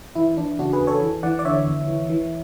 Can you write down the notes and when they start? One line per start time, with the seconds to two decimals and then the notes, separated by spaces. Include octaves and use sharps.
0.15 E3 E4
0.37 E3 D4
0.59 C#3 D4 F#4
0.73 G#4 B4
0.80 E2
0.87 A4 C#5
1.01 E3
1.23 E3 D5 F#5
1.39 D5
1.45 D3 C#5 E5
1.66 E2
1.88 E3
2.09 E3